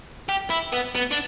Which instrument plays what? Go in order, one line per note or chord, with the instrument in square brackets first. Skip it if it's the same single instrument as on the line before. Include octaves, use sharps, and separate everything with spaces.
[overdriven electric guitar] G4
E4
B3
B3
D4